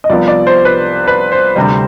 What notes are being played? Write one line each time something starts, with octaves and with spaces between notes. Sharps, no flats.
D#5
C2 C3 F3 B3 D5
D5
C5
B4
B4
C5
D2 C3 G3